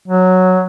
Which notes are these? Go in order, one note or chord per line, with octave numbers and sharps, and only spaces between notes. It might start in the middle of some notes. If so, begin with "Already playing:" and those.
F#3